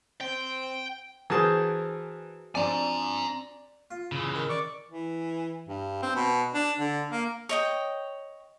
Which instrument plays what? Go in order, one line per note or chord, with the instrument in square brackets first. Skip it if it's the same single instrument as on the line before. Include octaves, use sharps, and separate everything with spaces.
[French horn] C4 [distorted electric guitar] G5
[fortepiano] E3 A#4 A5 [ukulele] F#4 G#4 C5
[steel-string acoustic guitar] F3 C4 D4 [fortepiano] D5 [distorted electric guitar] G#5 A#5
[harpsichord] F4
[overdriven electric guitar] C#3 E3
[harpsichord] D#3
[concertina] D5 C#6 D6
[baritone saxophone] E3
G2
C4
B2
D4
D3
A#3
[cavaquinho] C#5 D#5 G5